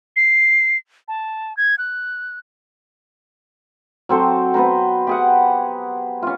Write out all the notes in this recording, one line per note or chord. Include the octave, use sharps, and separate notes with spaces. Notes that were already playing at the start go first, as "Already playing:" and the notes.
C7
A5
G#6
F#6
F#3 C4 A4 C5
B3 B4 C5 A#5
G4 G#4 F#5
C#4 F4